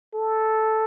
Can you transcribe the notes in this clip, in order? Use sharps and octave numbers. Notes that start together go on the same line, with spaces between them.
A4